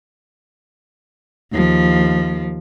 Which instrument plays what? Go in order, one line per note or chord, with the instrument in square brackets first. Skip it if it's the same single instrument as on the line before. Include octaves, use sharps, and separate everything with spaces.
[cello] D#2 F3